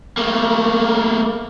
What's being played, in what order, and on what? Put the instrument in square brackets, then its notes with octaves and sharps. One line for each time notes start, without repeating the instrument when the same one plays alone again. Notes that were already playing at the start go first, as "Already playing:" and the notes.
[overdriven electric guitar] A3 A#3